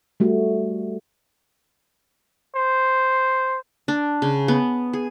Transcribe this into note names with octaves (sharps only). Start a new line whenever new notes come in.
G3 A3 F#4
C5
D4
C#3
B3
G#4